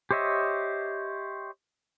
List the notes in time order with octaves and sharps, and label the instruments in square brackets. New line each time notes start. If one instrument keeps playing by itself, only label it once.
[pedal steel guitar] G4 C5 C#5 D#5 E5